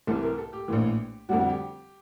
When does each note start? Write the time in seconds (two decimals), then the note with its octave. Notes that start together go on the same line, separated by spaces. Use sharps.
0.07 C2 C3 E3 A4
0.23 A#4
0.38 A4
0.53 G4
0.68 A#1 A2 E3
1.29 F2 D3 G3 F#4
1.39 F#4
1.49 G4